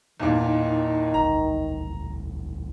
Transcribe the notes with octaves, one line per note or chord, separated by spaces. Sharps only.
B1 E2 A#2 D#3
G#1 D2 A#5